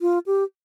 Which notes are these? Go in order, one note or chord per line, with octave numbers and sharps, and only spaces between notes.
F4
G4